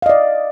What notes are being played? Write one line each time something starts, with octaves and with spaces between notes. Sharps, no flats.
D5 D#5 F5